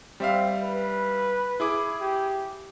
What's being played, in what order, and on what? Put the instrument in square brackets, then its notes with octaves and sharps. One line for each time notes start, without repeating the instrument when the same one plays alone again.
[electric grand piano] G3 E5 F5 [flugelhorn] C4
[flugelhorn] B4
[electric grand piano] E4 G#4 D6
[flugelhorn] G4